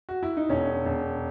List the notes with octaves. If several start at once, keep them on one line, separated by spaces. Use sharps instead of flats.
F#4
E4
D#4
E1 C#4
E1